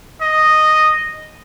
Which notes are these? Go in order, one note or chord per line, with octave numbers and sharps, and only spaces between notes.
D#5